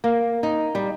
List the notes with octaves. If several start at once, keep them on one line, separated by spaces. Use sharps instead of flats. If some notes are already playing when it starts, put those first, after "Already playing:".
A#3
D#4
G3